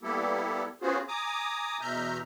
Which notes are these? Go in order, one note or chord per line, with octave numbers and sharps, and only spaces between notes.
G3 A#3 B3 E4 G4 A4
B3 C#4 F4 F#4 G#4 C5
G#5 A#5 D6 D#6
E2 B2 E5 A#5 F6 G6